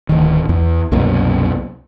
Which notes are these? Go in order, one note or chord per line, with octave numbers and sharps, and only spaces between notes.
D1 D#3
E2
C2 F#2 B2 A#3